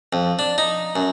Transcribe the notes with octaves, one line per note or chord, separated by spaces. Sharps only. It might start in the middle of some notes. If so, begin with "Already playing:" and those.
F2
D4
D#4
F#2